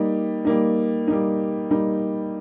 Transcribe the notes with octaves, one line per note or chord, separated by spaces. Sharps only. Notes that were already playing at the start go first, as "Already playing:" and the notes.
Already playing: G3 A#3 D#4
G3 A#3 D#4
G3 A#3 D#4
G3 A#3 D#4